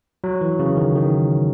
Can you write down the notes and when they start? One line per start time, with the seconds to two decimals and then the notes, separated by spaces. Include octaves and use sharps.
0.24 F#3
0.41 E3
0.59 C#3
0.77 D#3
0.95 D#3